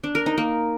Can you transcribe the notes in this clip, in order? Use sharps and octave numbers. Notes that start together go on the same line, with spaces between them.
D4
A#4
D#4
A#3